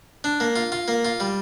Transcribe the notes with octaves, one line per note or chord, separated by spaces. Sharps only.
D4
A#3
F4
F4
A#3
F4
G3